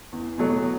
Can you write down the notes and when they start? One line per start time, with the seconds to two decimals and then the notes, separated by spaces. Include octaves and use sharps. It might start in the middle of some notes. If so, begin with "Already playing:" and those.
0.13 E2
0.38 B2 F#3 A3